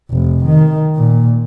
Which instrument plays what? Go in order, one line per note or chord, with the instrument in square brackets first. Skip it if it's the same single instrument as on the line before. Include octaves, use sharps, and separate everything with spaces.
[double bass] F1
D#3
A#2